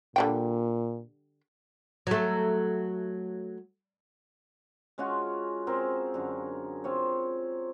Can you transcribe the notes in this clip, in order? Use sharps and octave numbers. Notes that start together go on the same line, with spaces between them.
A#2 D3 G3 G5
F#3 A3
G#3 C#4 F4 F#4
C4 G#4 A#4
F#2 D3
C4 F4 C#5